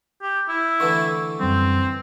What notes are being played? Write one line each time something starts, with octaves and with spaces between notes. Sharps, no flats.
G4
E4
D3 E3 A3 C#6
F#2 G3 C4